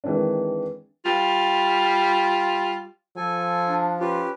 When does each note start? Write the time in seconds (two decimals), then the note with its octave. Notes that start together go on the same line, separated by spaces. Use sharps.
0.04 D#3 E3 G#3 C4 D4
1.06 G3 F4
3.17 F3 A4 G#5
3.67 D4
4.00 C#4 F4 G4 B4